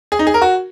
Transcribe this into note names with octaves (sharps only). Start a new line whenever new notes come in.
G#4
D#4
G#4
A#4
F#4